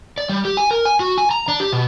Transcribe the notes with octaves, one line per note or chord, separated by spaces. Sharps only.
D5
G3
G4
G#5
A#4
G#5
F#4
G#5
A#5
D4
G4
B2